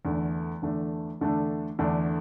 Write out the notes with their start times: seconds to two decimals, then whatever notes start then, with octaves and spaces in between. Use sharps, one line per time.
0.05 E2 D3 A3 D4
0.62 E2 D3 A3 D4
1.21 E2 D3 A3 D4
1.79 E2 D3 A3 D4